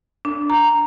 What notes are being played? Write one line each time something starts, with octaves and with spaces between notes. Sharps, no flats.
D4
A#5